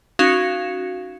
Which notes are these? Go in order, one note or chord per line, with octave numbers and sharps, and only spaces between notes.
C#4 D#4 F#4 F5 C#7 E7